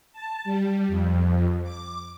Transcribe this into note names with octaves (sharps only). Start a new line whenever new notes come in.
A5
G3
F2
D6